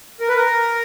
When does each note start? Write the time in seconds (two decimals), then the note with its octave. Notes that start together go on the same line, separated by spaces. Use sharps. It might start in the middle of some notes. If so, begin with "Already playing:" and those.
0.21 A#4
0.28 B4
0.36 A#4